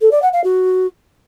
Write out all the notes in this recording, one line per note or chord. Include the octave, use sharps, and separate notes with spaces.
A4
D5
F#5
F5
F#4